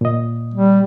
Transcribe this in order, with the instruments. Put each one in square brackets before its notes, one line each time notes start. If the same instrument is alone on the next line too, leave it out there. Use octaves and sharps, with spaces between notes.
[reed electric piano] A#2 D#5
[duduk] G3